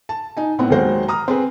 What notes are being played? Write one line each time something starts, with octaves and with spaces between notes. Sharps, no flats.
A5
D#4 G#5
A2 B3 C4 F#5
D#2 F#3 G#3 A#4 C5 F#5
A#5 D#6 F6
C4 G#4 B4